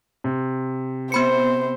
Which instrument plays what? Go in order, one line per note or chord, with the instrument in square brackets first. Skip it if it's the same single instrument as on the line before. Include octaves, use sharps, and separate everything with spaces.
[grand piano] C3
[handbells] B3 B5 C#7 [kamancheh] C5